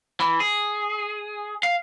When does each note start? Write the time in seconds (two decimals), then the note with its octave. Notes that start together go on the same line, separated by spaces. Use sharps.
0.20 E3
0.40 G#4
1.63 F5